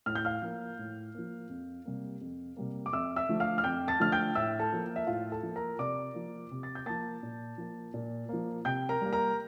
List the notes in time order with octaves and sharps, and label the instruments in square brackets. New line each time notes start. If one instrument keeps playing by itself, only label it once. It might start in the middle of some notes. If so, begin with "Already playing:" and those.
[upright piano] A2 F6
G6
F5 F6
F3 A#3
A2
F3 A#3
F2
C3 G3 A#3
F2
C3 G3 A#3
D6
F2 E5 E6
E5 E6
D3 F3 A3
F5 F6
F6
F2 G5 G6
A5 A6
D3 F3 A3 F6
G5 G6
A2 E5 E6
A4 A5
F3 A#3
E5
A2 F4 F5
A4 A5
F3 A#3
A#4 A#5
C3 D5 D6
F3 A#3
C3
A6
G6
F3 A#3 A5 A6
A#2
F3 A#3
A#2
F3 A#3
C3 G5 G6
A#4 A#5
G3 A#3
A#4 A#5